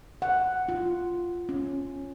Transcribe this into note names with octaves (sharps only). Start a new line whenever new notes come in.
F#5
F4
C#4